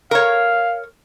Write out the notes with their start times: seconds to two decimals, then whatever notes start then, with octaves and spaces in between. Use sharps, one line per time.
0.11 A#4 C#5 F5